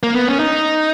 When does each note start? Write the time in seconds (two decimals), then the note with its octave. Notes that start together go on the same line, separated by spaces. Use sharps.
0.03 A#3
0.15 B3
0.28 C#4
0.39 D#4